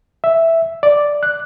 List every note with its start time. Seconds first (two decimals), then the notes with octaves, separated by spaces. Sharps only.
0.24 E5
0.83 D5
1.23 F#6